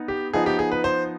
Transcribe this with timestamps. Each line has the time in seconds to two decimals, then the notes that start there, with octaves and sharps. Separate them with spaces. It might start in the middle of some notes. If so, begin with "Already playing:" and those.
Already playing: B3 D#4
0.08 G4
0.33 F3 B3 D#4 G#4
0.46 G4
0.59 G#4
0.72 B4
0.84 C5